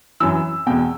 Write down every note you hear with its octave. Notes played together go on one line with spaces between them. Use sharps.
F#2 E3 E6
E2 B2 G5